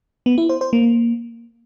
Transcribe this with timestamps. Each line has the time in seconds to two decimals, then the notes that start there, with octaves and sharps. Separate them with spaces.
0.26 B3
0.38 E4
0.49 C5
0.61 C5
0.73 A#3